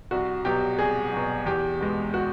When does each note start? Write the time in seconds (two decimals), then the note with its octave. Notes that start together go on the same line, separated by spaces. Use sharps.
0.11 C2 F#4
0.45 B2 F#3 G4
0.78 C2 G#4
1.13 B2 F#3
1.46 E2 G4
1.80 B2 G#3
2.14 F#4